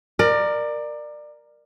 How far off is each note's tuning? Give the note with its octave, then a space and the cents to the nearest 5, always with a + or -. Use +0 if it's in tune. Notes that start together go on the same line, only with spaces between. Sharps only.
A#4 +0 D5 +25